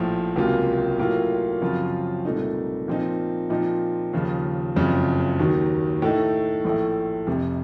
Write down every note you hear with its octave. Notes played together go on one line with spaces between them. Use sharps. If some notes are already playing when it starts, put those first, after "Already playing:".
Already playing: A#1 A2 F3
C#2 C3 F#3 A#3 F4
A2 F#3 A#3 F4
F#2 C#3 F3 C4 F4
C2 A#2 A3 D#4
A#2 F3 C4 D#4
A#2 F3 C4 D#4
D#2 C#3 F3
F#1 F2 C#3 F3
D#2 D#3 F#3
A2 A3 D#4
A#1 A2 A3
F1 F2 C3